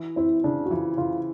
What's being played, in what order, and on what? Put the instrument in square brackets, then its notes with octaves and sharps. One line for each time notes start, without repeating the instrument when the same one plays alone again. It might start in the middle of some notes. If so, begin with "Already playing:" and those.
Already playing: [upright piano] E3
[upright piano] C4 [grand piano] E4
[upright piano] C#3 [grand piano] D4
[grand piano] F#4
[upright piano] E3 [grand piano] F4
[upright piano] C#3 [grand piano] F4